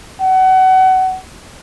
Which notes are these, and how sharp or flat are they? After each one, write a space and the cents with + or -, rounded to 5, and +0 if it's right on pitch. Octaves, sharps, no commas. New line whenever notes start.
F#5 +25